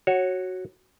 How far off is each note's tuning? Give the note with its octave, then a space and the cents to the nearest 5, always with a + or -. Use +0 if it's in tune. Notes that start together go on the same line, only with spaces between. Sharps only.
F#4 +0 C#5 -15